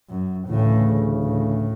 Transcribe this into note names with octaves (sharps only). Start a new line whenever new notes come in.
F#2
D2 A2 C#3 E3
A2